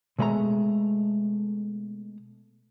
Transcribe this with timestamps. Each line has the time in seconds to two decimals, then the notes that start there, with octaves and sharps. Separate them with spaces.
0.19 B2 G#3 A3 D#5 A#5